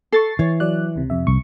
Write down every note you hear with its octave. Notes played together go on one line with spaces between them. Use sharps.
A4 C#6 A6 C7
E3 C#5
F#3 D5 F#6
C#2 C3
F2 C3 E5
C2 C#6